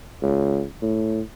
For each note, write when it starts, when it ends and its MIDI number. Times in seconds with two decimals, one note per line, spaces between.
0.22 0.63 37
0.82 1.21 45